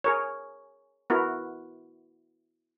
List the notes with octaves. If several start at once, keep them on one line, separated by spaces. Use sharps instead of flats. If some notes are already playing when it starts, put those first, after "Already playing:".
G#4 A#4 C#5
B3 E4 F#4 A#4